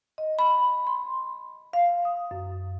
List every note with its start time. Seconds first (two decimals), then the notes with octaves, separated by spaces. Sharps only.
0.18 D#5
0.39 B5
0.87 C6
1.73 F5
2.05 D#6
2.31 F#2